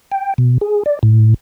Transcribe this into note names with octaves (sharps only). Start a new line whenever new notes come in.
G5
B2
G#4
D5
A2